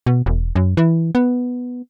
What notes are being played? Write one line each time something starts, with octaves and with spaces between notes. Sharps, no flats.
B2
E1
F#2
E3
B3